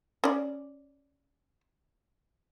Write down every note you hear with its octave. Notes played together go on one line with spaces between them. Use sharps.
C#4 D5